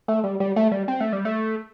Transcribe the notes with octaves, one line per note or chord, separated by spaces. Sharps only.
A3
G3
G3
A3
G3
C4
A3
G3
A3